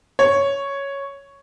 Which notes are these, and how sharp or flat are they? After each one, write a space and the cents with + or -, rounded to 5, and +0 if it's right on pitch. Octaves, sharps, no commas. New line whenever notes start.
C#5 +0